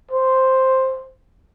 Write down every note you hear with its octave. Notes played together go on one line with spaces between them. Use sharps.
C5